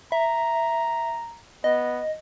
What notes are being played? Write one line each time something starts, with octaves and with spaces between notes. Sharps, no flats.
E5 A#5
B3 D#5